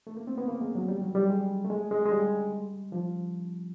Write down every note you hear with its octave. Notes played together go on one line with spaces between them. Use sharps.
A3
A#3
C4
B3
A#3
G#3
F#3
G3
F#3
G3
G#3
A3
G#3
G#3
G#3
G3
F3